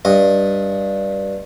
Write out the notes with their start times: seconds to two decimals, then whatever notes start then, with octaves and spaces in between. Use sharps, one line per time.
0.05 G2 D#5